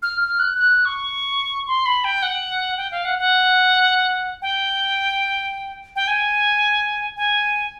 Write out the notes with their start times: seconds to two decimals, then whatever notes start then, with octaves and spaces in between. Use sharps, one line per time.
0.02 F6
0.21 F6
0.39 F#6
0.58 F#6
0.85 C#6
1.67 C6
1.86 B5
2.04 G5
2.23 F#5
2.78 G5
2.92 F5
3.05 F#5
3.19 F#5
4.42 G5
5.96 G5
6.08 G#5
7.17 G#5